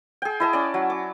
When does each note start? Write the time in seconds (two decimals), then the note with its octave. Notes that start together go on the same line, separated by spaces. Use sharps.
0.22 G#4 G5
0.40 E4 D#5 A5
0.53 C#4 D5
0.74 F#3
0.90 D6